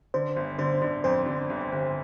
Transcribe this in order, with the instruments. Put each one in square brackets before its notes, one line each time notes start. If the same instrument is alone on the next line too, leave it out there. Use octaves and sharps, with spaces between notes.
[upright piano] D3 [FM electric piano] C5
[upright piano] G1
[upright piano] D3 [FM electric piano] C5
[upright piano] D3
[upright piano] F2 [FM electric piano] C5
[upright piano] D3
G1
G1